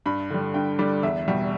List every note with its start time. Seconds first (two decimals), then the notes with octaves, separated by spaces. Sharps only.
0.06 G2 B5
0.30 D3 G3
0.54 G2 G5
0.79 D3 G3 D5
1.03 E2 E5
1.28 B2 G3